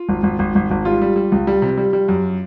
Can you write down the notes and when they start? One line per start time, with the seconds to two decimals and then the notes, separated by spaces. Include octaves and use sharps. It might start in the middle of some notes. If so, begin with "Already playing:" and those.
Already playing: F4
0.09 G#1
0.23 G#1
0.39 G#1
0.55 G#1
0.71 G#1
0.85 G3 F4
1.02 G3
1.16 G3
1.32 C#2
1.47 G3
1.62 C3
1.78 G3
1.93 G3
2.09 F#2